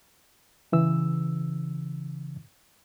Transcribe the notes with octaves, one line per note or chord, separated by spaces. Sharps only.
C#3 E3 E6